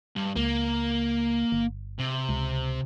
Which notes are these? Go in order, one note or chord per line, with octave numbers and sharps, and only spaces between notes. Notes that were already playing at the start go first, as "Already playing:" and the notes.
G2
C#2 A#3
G1
C3
C#2